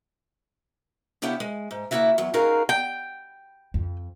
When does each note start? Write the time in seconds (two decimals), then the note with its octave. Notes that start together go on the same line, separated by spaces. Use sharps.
1.22 C#3 B3 D4 E4 G4 C#5
1.40 G#3
1.71 G#2
1.91 C#3 A#3 E4 F#4 E5
2.18 E2 F#3
2.34 C#4 D#4 F#4 G#4 A#4 F5
2.69 G5
3.74 F2